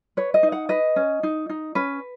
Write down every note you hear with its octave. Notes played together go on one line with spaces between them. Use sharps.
B4 C#5
D#5
D#4
F#5
B4 D#5
C#4
D#4
D#4
C#4 B4